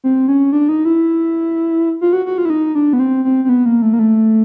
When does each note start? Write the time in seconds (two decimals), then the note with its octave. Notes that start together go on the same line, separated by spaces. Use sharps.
0.04 C4
0.28 C#4
0.52 D4
0.69 D#4
0.85 E4
2.01 F4
2.13 F#4
2.26 F#4
2.38 F4
2.45 E4
2.50 D#4
2.75 D4
2.93 B3
2.99 C4
3.24 C4
3.44 C4
3.49 B3
3.66 A#3
3.82 A3
3.93 A#3
3.99 A3